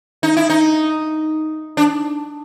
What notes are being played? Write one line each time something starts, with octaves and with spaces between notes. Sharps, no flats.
D#4
E4
D#4
D4